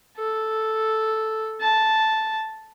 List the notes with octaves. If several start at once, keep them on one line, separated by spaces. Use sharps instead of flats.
A4
A5